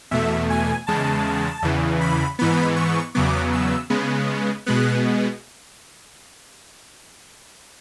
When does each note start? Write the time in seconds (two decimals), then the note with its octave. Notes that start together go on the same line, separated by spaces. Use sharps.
0.11 E2 B2 A3 E5
0.50 G#5
0.87 E2 C#3 G#3 A5
1.63 E2 C#3 E3
2.01 B5
2.39 G#2 E3 B3 B5
2.76 C#6
3.14 E2 C#3 F#3 B3 D6
3.53 E6
3.90 C#3 G#3 B3
4.66 B2 G#3 B3 F#6